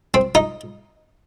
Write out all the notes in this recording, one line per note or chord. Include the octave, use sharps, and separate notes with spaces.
C4
D#4